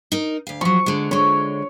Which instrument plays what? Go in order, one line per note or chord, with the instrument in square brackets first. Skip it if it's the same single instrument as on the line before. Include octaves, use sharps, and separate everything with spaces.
[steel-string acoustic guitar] D#4 A#4
D2 F5
[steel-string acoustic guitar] F3 F#3 [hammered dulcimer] C#6
[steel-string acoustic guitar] D3 G#3
[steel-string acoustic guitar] D3 G#3 [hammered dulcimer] C#5